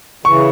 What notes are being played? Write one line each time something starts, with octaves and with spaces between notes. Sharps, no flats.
C#3 E3 C#6